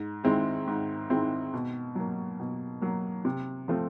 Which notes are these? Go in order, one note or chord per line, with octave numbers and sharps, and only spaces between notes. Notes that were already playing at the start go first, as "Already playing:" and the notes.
Already playing: G#2
D#3 G#3 C4 E4
G#2
D#3 G#3 C4 E4
B2
F#3 A#3
B2
F#3 A#3
C3
F3 A3 C4 F4